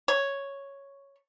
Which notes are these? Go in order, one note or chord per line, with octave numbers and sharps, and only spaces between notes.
C#5